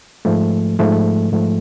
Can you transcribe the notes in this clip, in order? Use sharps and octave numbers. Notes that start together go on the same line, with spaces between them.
G#2 F3 A3
G#2 F3 A3
G#2 F3 A3